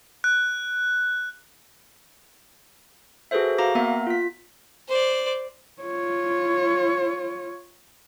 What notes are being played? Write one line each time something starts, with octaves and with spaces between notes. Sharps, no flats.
F#6
F#4 G#4 A4 B4 C5 E5
F#4 F5 A#5 D6 A#6
A#3 B3 A#4 E5 A#5
F4 B6
C5 D5
F4 C#5